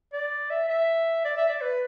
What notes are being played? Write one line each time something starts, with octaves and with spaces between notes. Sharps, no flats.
D5
E5
E5
D5
E5
D5
B4